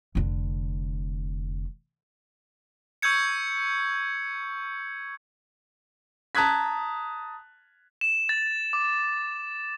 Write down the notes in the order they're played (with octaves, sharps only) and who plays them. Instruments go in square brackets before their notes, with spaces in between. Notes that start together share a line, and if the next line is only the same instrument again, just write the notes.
[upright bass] F1 D3
[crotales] C#6 E6 G6 G#6 C#7
[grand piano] A5 A#5 D#6 F#6 G#6 B6
[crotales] E7
A6
D6